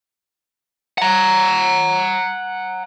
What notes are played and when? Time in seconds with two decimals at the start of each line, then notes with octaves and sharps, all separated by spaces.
0.98 F#5 A#5